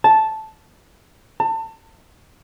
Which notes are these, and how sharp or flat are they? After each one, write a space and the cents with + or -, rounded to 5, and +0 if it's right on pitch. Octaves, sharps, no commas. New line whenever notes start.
A5 -5
A5 +30